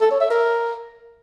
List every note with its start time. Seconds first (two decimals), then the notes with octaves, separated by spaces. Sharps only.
0.01 A4
0.11 C#5
0.20 E5
0.30 A#4